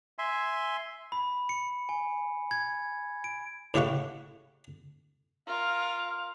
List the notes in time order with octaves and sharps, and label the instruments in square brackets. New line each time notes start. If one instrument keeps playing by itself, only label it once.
[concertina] E5 G#5 C6
[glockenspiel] B5
C#7
G#5
G#6
D7
[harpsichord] A2 C#3 G4 E5 F#5 C#6
[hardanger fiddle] F4 A#4 [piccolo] F5